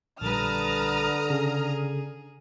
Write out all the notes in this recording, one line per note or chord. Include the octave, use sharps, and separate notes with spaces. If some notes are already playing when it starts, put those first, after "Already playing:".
A#1 D3 G3 B4 A5 A#5 D#6 F6
C#3 G#4